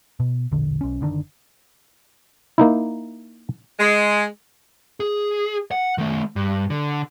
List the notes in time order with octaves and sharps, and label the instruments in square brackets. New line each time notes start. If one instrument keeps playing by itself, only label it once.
[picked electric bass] B2
E1 A#1 D3
B1 C#4
F#1 D3 D#3 D4
[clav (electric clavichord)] A#3 D#4 E4
[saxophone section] G#3
[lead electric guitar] G#4
F#5
D#3 A3
G2
D3